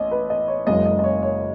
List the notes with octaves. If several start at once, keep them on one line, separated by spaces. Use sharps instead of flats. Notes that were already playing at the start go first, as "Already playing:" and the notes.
Already playing: A1 D#5
B4
D#5
C#5
F#1 F#2 C#3 G#3 D#5
D#5
D#5
C#5
C#5